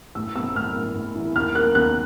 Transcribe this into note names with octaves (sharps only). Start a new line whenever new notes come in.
A2 E6
C4 E6
A2 F6
A2
A2
E3
D#2 F6
A#3 F#6
D#2 F#6